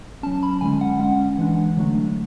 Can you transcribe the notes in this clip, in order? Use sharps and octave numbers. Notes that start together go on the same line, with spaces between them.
F#3 C#4 A5
B5
D3 G#3 C#4 G#5
F#5
G#3 C#4 F#5
E3 G#3 D4
D3 F#3 A3 D4